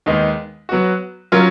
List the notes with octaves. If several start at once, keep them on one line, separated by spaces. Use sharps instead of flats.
D#2 D#3 G#3 B3 D#4
F#3 B3 F#4
F#3 C#4 F4 A#4